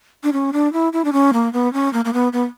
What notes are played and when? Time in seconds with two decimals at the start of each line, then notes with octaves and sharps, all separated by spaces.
0.23 D4
0.33 C#4
0.53 D4
0.73 E4
0.93 E4
1.05 D4
1.13 C#4
1.33 A#3
1.53 B3
1.73 C#4
1.93 A#3
2.05 A#3
2.13 B3
2.33 B3